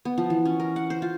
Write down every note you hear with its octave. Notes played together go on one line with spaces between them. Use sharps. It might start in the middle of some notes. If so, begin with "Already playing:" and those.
B3
F3
E3
C#4
A#4
F#5
C5
F4